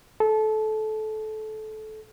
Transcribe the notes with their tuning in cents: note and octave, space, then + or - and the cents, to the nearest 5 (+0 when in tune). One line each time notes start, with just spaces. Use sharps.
A4 -20